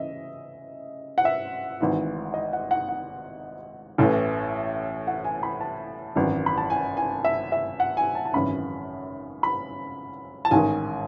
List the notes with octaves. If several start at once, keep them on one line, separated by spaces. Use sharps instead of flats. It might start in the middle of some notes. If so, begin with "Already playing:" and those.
Already playing: C#3 E3 D#5 E5
F#5
E5
G#1 G#2 E3
D#5
F#5
F#5
F#5
A1 A2 E3
F#5
G#5
B5
A5
G#1 F#2 E3
B5
A5
G#5
G#5
E5
E5
F#5
G#5
A5
A5
G#1 F#2 C#3 E3 B5
B5
A5
A1 G#2 D#3 G#5